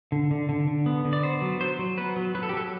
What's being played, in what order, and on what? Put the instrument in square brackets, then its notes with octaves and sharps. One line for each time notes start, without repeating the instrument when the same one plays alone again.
[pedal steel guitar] D3
D3
D3
D3
B3
D3
D5
B3 C5
F#3
F#3 C5
F#3
B3 B4
F#3
F#3 B4
A4
G4
F#3 A4